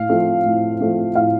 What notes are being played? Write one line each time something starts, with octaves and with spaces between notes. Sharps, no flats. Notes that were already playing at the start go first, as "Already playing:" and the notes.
Already playing: A2 F5
F3 A3 C4
A2
F3 A3 C4
A2 F5